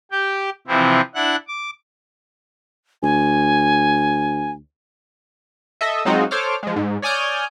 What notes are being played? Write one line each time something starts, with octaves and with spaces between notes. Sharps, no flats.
G4 G5
C3 E3 F3 C4 E4
D4 E4 F#5 F#6
D6
D2 G#5
A4 D#5 E5
F#3 G#3 C4 D#4 F4 F#4
A4 C5 C#5 D6 F6
F3 G#3
G#2
C#5 D5 G#5 D#6 F6 G6